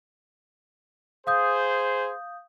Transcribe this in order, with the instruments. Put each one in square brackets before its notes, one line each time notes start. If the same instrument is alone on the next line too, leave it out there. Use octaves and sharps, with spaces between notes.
[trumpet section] G#4 C5 [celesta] F5 D#6 G6